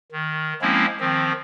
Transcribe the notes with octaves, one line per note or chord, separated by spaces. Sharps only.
D#3
F3 G#3 A#3 C4 C#4 E4
D#3 F3 C4